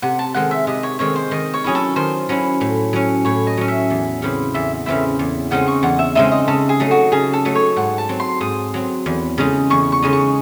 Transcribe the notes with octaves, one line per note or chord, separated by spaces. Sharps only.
C3 F#5
A5
D#3 G#3 C4 F#5
E5
C3 D#5
C#5
D#3 G#3 C4 C#5
C5
D#3 D#5
C#5
F#3 C#4 E4 G#4
A4
D#3 C5
F#3 C#4 E4
A2
F#3 C#4
A2 C#5
D#5
F#3 C#4
E5
E2
C#3 E3 C4 E4
E2 E5
C#3 E3 C4 E4 E5
E2
C#3 G#3 C4 D#4 F#5
C#6
E2 F#5
E5
C#3 G#3 C4 D#4 E5
D#5
C#3 A4
G#4
F#3 A3 D#4
F#4
C#3 G#4
A4
F#3 A3 D#4
C#5
G#2 F#5
A5
F#3 C4
C6
G#2 D#6
F#3 C4
E2
C#3 G#3 D#4
E2 C#6
C#6
C#3 G#3 D#4
C#6